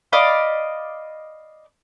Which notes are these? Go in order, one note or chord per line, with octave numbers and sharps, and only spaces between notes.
D5 D#5 F5 B5